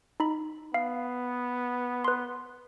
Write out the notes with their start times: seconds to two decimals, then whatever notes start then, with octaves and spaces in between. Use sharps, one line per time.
0.20 D#4 B5
0.74 B3 F5
2.04 B4 C6